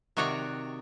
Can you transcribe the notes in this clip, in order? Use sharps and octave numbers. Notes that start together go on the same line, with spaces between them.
C3 D#3 F#4 C#5 D5 A#5